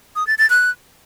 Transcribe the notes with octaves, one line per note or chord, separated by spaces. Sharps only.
D#6
A6
A6
F#6